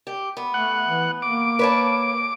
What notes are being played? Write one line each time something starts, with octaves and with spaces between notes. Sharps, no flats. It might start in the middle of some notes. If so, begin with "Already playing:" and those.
G4
B3
A3 F#5
E3
A#3 D6
B4 C#5 A5